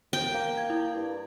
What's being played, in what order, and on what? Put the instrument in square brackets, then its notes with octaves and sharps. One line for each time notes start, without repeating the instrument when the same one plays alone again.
[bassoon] D#2 [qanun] G5
[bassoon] A#3 [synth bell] F5
[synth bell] G#6
E4
[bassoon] G2